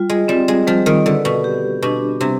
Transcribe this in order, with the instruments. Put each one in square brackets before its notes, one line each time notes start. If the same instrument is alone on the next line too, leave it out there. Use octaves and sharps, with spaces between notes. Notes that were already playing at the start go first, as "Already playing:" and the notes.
Already playing: [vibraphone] G3 F4
[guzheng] G#3
[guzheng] G3 [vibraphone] C4
[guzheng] G#3
[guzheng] F3 [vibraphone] G3
[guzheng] D#3
[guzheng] D3 [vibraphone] B4
[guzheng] B2
[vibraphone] G4
[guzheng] B2 [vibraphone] D4
[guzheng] C3 [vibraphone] G3